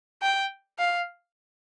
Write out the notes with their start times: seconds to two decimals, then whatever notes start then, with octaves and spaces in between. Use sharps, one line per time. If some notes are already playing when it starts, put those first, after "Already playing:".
0.22 G5
0.79 F5